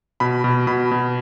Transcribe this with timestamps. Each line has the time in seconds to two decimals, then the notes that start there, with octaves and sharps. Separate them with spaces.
0.20 B2 B5
0.44 B2
0.67 B2 B5
0.91 B2